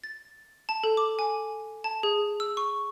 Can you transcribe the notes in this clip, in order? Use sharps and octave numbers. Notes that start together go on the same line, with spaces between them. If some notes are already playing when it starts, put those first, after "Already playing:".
A6
A5
A4
D6
G#5
A5
G#4
E6
C#6